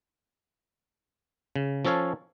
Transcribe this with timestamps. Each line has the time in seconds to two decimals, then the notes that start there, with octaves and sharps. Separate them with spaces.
1.56 C#3
1.85 F3 C#4 A4 C#5 F5